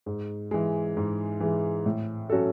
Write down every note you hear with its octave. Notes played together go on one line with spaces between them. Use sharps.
G#2
E3 G#3
G#2
E3 G#3
A2
F#3 C#4 F#4 A4